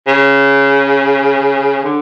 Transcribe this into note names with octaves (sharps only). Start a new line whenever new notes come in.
C#3
D3